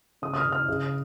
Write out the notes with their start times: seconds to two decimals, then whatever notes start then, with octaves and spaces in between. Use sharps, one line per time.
0.22 C#3 D#6
0.34 D#6
0.38 F6
0.46 C#3
0.52 F6
0.68 C#3